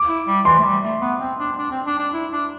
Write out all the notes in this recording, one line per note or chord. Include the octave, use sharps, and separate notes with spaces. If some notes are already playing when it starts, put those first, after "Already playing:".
Already playing: D6
E4
G3
E3 C6
A3
G3
A3
B3
C4
D4
D4
C4
D4
D4
E4
D4